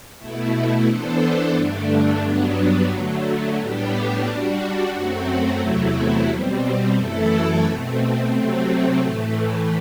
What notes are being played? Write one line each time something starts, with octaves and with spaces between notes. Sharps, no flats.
B2 A3 E4
E3 B3 D4 A4 C5
G2 D3 A3 D4
G2 F#3 B3 D4
D3 F#3 A3
A2 G3 B3 D4 G4
G3 D4 F#4
F#2 F#3 A3 C4 F#4
E2 C3 F#3 A3 E4
B2 G3 C4
F#2 E3 A3 E4 A4
B2 A3 C4
C3 F#3 A3 C4
A2 E3 A3